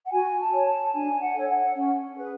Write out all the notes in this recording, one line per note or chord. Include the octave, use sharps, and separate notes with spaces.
F#5
F#4 G#5
A5
C#5
A5
D4 G#5
F#5
A4
C#5
F#5
C#4
G#4 B4